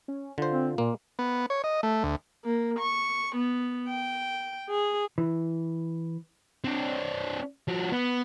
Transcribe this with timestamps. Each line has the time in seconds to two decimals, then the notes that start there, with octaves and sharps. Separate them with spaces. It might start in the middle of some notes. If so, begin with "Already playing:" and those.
0.08 C#4
0.38 D3 F4 C5
0.51 C4
0.78 A#2 A#3
1.19 B3
1.50 C#5
1.64 D#5
1.83 A3
2.03 D2
2.45 A#3
2.79 C#6
3.35 B3
3.89 G5
4.70 G#4
5.18 E3
6.64 C4 D4
7.68 F3 F#4
7.92 B3